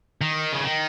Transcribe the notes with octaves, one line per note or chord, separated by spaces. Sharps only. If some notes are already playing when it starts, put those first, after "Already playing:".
D#3
C#3
D#3